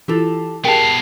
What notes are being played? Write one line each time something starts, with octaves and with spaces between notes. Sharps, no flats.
E3 E4 F4 G4 A4
B3 G4 G#4 A#4 F5 G5 A5